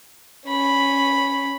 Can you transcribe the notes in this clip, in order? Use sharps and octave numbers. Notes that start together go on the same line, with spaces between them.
C#4 B5